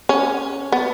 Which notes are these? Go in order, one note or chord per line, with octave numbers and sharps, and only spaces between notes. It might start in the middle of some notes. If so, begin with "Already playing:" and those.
C#4
B3